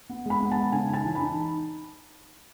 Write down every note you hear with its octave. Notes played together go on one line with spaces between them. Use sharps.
B3
G#3 B5
B3
A5
G#3
C#3 G#5
D#4 A5
E3
B5
D#4